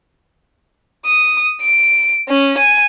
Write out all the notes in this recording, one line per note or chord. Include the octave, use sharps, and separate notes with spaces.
D#6
D7
C#4
G#5